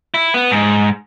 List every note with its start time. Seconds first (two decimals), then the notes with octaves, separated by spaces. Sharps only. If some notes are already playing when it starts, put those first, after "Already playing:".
0.14 E4
0.34 B3
0.51 G#2